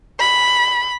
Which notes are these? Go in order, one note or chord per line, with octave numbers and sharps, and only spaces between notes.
B5